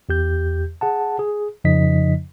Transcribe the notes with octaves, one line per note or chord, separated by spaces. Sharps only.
E2 G4 G6
G#4 F#5 A5
G#4
F2 C#3 F3 D#4 D#5 B6